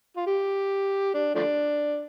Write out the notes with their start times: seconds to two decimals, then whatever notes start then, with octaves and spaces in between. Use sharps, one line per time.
0.17 F4
0.27 G4
1.14 D4
1.35 F3 A3 D4